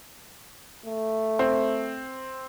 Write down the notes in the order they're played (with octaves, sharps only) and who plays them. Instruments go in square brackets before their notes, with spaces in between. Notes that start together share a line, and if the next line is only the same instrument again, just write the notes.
[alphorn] A3
[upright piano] C4